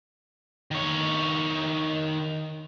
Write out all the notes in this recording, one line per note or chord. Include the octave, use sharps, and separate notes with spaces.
D#3 C#5